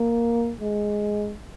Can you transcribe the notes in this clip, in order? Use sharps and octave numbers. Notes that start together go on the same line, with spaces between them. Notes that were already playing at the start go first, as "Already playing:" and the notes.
Already playing: A#3
G#3